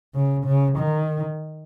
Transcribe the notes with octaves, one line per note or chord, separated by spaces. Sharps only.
C#3
C#3
D#3